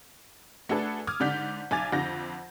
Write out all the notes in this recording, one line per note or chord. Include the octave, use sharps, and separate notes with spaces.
A3 D4 F#4 G#4 A4 B4
D6 D#6 F6 G#6
G#2 D3 D5 G6 B6
B1 G#5 D6 G#6 A6 F7
F2 D3 G6 A#6